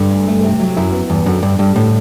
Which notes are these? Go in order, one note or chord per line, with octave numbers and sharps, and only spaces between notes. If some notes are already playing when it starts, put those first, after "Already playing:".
Already playing: G2 D3
D2
A3
C3
F#3
F#2 E4
B3
E2 G2
F#2 D3
G2 D4
G2 G3
A2 D3